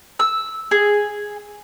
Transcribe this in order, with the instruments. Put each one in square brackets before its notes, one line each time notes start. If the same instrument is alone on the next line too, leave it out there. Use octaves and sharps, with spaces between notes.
[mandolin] E6
G#4